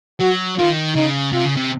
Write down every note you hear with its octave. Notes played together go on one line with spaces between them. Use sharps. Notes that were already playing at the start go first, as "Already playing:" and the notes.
F#3 F#4
D#3 F4
C#3 D#4
C3 F4
C#3
C3